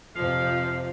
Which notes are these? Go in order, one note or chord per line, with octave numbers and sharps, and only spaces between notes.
F2 C3 F3 F5